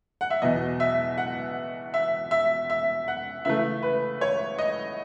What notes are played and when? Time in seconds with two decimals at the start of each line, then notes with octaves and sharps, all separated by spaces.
0.21 F#5
0.30 E5
0.42 E2 B2 F#3 D#5
0.80 E5
1.18 F#5
1.94 E5
2.31 E5
2.70 E5
3.08 F#5
3.45 C#3 E3 A3 E5
3.83 B4
4.21 C#5
4.59 D#5